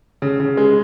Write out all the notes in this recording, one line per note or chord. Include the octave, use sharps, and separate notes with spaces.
C#3
C#3
G#3